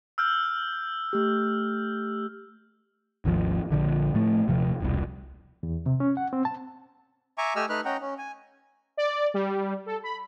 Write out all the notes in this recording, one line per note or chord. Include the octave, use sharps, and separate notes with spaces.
E6 F6 G6
A3 G4
G#1 D#2 C#3 F3
A#1 D3 D#3 F3
A2 F3 A3
D#1 C3 F3
E1 C2
E2
C3
C#4
F#5
C4
A5
E5 G#5 A#5 C#6 D6
A3 G4 D#5 G#5 E6 F6
A3 D#4 B4 F6 F#6
C#4 D#5 F#5 G5 A#5
C#4
G#5
D5
G3
A4
B5